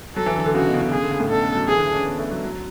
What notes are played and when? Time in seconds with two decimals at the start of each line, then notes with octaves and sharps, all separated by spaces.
0.16 F#3 A4
0.26 E3
0.35 D3
0.45 D3
0.55 C#3 F#4
0.67 B2
0.74 C#3
0.80 B2
0.92 C#3 G#4
1.02 D3
1.11 C#3
1.20 A2
1.29 B2 A4
1.42 C#3
1.55 F#3
1.68 E3 G#4
1.77 D3
1.86 E3
1.92 D4
1.96 C#4
2.05 B3
2.18 A3
2.31 F#3
2.43 F#3